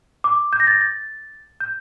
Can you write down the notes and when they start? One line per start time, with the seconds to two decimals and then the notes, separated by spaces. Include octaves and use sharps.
0.24 D6
0.53 G6
0.60 A#6
0.67 A6
0.81 A6
1.60 G6